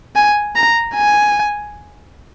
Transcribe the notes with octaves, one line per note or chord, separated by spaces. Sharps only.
G#5
A#5
G#5